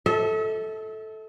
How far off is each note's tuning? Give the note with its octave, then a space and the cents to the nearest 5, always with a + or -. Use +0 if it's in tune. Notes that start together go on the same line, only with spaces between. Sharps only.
A4 -5 E5 -40